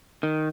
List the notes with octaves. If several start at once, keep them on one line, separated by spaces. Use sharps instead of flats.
D#3